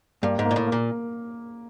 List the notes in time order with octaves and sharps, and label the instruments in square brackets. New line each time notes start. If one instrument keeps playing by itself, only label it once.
[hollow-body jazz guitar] G2 [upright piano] A#3
[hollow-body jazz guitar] G#2
[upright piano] A#3
[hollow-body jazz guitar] A#2
A2
[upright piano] A#3
[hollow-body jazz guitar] A#2